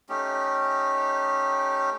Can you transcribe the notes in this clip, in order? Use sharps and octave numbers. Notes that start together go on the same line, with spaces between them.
A3 C#4 D#4 G4